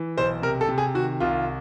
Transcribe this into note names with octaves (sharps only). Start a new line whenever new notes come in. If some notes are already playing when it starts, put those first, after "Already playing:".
Already playing: E3
B1 C5
C3 A#4
A4
C3
G#4
D#3 F#4
C2 F4